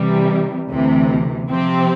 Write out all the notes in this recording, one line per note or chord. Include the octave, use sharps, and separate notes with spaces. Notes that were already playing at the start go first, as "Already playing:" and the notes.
Already playing: C3 E3 G3
D2 C3 E3
C3 F3 C4 G4